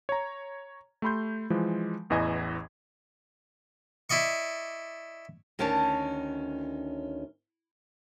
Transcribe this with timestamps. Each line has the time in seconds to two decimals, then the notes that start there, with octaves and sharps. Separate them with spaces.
0.09 C#5 A#5
1.02 A3 G4 B5 C6 G6
1.50 E3 F3 G#3
2.10 A1 E2 E3 D#5 G#5 G#6
4.09 E4 D5 D#5 C#6
5.59 D2 D#3 C#4 D4 C#5 A5